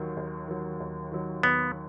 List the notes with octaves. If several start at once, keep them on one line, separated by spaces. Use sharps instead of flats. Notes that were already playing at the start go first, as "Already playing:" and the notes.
Already playing: D#2 D#3 F#3
D#2
D#3 F#3
D#2
D#3 F#3
D#2 B3